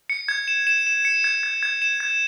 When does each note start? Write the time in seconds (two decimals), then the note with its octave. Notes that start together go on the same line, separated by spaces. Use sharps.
0.10 C#7
0.28 G#6
0.48 E7
0.67 E7
0.87 E7
1.05 C#7
1.24 G#6
1.43 G#6
1.63 G#6
1.82 E7
2.00 G#6